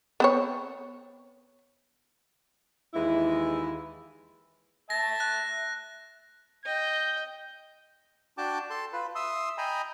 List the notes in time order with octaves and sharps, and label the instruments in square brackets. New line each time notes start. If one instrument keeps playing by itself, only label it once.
[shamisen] B3 C4 C#5
[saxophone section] D#2 E3 G#3 E4
[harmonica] E5 A5 [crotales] A#6
[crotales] F#6
[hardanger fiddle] D#5 G5 [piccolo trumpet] G6
[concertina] D4 F#4 G5 A5 D6
A4 A5 C6
F4 B4
E5 C6 D#6 E6
D#5 G5 G#5 A#5 B5